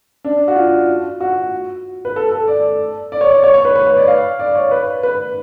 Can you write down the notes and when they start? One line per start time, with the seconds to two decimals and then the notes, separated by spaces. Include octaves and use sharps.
0.24 D4
0.48 F#4
0.56 F4
1.21 F#4
2.05 B4
2.16 A4
2.32 A4
2.48 D5
3.12 D5
3.21 C#5
3.31 D5
3.44 C#5
3.54 C#5
3.65 B4
3.76 B4
3.87 C#5
3.97 D5
4.08 F5
4.39 D5
4.55 C#5
4.71 B4
5.03 B4